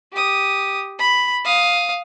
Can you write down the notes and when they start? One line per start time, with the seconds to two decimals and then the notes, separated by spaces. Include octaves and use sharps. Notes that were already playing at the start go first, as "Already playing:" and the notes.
0.13 G4 D#6
0.99 B5
1.45 F5 D#6